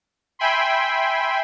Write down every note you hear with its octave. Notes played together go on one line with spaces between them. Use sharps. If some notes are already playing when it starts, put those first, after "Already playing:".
E5 G5 G#5 B5 C6